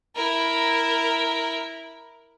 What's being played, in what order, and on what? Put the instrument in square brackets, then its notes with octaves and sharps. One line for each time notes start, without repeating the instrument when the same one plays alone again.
[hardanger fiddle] E4 A#4